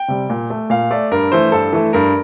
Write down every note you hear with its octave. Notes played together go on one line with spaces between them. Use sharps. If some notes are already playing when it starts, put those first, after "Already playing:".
Already playing: G5
C3 G3
A#2
A3
A#2 F5
A3 D5
G2 A#4
E3 A3 C5
G2 A4
E3 A3
G2 A#4